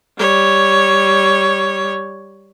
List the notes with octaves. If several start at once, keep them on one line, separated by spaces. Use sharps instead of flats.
G3 C#5